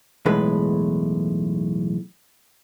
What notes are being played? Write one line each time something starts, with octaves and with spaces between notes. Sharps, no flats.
B1 E2 A2 G#3 B4